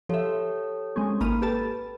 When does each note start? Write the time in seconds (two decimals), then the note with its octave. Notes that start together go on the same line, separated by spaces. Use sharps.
0.09 F3 G4 A4 C#5 E5
0.96 G#3 C4 C#4
1.21 G#1 A#3 B5 D#7
1.42 G4 A4 B4 A5